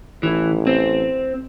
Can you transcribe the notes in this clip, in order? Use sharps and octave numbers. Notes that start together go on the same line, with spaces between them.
A1 E3
C4